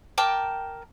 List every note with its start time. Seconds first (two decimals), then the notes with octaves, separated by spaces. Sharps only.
0.18 A#4 G5 A5 D6